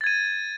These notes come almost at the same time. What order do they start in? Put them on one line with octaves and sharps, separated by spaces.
A6 G#6 D#7